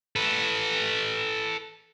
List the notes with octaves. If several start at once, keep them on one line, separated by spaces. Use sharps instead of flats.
A4 B4